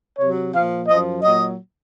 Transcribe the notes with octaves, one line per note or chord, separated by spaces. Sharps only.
C3 F#3 C#5
A#2 F3 F5
F#2 F3 D#5
A#2 F#3 D#5